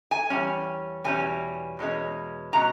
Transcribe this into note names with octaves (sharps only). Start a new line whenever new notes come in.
G#5
E2 B2 G3 C#4
E2 B2 G3 C#4 G#5
E2 B2 G#3 C#4
B2 G#3 C#4 A#5